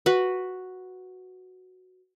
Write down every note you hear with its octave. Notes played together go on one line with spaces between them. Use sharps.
F#4 B4